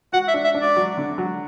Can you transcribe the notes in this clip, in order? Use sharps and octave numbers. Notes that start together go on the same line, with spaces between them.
F#4 F#5
E5
D4
E5
D4
D5
F#3
D3
F#3